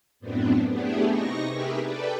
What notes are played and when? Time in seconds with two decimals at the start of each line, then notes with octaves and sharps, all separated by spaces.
0.20 F#2 A2 B3 C4 D4
0.70 A3 B3 D4 E4 G4 G#4
1.08 C3 D#4 C#6 A#6
1.51 G4 G#4 A#4 B4 E5
1.83 A4 B4 D5 G5